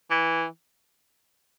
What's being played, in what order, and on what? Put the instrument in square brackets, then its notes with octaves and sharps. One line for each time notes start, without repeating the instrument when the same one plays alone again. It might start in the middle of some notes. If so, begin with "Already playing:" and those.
[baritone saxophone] E3